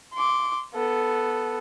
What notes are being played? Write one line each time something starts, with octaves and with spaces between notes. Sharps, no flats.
C6 D6
B3 A4